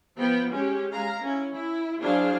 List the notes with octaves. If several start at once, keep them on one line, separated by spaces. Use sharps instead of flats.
F3 B3 G5
G#3 C#4 G4
G#3 F5 A#5
C#4 E4
E4
F#3 D4 E4 G#4 C5 F5